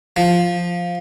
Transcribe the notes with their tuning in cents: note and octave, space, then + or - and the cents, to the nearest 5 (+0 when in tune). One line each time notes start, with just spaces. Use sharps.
F3 +5